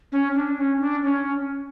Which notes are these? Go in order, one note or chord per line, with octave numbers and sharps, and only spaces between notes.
C#4
D4
C#4
D4
C#4